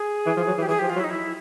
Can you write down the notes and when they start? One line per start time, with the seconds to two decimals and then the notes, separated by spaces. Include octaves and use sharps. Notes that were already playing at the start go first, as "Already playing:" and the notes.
Already playing: G#4
0.26 E3
0.37 F3
0.47 F#3
0.58 E3
0.62 G4
0.68 E3 G#4
0.79 F3 G4
0.89 F4
0.96 F#3
1.00 E4
1.04 D#4
1.10 E4